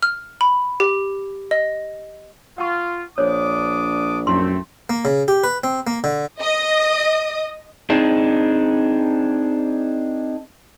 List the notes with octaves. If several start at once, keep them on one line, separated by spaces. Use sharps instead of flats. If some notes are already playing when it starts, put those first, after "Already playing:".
F6
B5
G4
D#5
F4 F#5 A5 C#6
A#1 D4 C5 C#5 D6 D#6
F#2 A3 C4 E4 C6
A#3
C#3
G4
B4
C4
A#3
D3
D#5 D#6
C4 D4 D#4 G#4